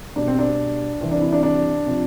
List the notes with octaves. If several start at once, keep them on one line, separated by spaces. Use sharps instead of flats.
B2 G3 D4
C4
D4
C3 E3 G3 C4
D4
E4
D4
D4
C3 F3